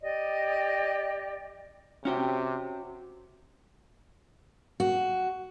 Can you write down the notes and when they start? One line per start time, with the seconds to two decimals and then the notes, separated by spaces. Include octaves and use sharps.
0.01 G4 D5 D#5
2.05 C3 C#4 F#4 G4
4.80 F#4